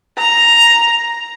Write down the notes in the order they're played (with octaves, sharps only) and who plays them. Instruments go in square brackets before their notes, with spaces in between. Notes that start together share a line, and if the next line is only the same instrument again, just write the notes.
[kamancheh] A#5